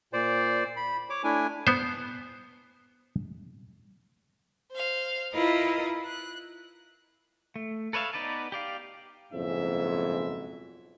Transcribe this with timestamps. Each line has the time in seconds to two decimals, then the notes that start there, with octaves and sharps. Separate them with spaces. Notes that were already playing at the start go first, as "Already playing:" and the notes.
0.13 A#2 C5 D5
0.76 B5
1.10 C#5 D6
1.24 A3 D4 E4 G#5
1.67 B3 C5
4.73 C5 F5
5.32 E4 F4 A#4 B4 D#5
6.04 F#6
7.56 A3
7.93 A4 B4 C#5 E5 F5
8.13 B3 D#4 B4 D5 A5
8.52 G4 D5 F5
9.32 F#1 F2 G#2 B2 C#4 E5